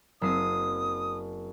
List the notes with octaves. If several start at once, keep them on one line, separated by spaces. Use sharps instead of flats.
F#1 C4 D#6 C7